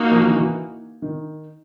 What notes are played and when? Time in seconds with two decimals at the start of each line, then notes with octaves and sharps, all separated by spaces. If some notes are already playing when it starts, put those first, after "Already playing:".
Already playing: A#3 D#4 F#4
0.11 F3
0.20 E3
0.28 D#3
0.36 E3
1.02 D#3